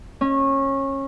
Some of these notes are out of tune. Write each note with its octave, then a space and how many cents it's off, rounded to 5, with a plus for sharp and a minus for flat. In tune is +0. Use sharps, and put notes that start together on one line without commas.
C#4 -25